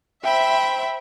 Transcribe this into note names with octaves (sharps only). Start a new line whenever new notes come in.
C5 E5 G5 B5